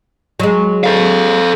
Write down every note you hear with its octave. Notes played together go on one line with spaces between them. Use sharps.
F#3 G#3
A4 F5